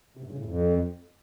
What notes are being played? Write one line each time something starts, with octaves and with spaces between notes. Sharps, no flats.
C3
G2
C#3
A2
F2